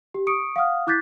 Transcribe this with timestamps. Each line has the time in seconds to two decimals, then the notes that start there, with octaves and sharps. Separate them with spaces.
0.14 G4
0.27 C#6 D#6 C#7 D7
0.56 F5 F#5 D#6 F6
0.87 E4 D6 F#6 G6 A6 B6